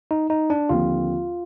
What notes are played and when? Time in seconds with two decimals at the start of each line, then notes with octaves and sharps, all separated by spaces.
0.11 D#4
0.30 D#4
0.50 D4
0.69 D#2 D3 F3 C4 F4